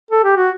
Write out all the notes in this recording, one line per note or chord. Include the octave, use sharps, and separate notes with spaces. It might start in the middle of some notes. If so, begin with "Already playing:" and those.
A4
G4
F#4